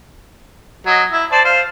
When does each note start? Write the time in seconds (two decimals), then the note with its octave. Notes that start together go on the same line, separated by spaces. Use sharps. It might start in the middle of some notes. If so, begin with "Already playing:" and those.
0.86 F#3 D#5
1.12 E4
1.32 C5 D5 A5
1.45 C5 F5